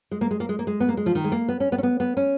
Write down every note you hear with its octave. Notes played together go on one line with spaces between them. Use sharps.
G#3
A#3
G#3
A#3
G#3
A#3
G#3
B3
A#3
G#3
F3
D#3
G#3
A#3
B3
C#4
B3
C#4
B3
B3
C#4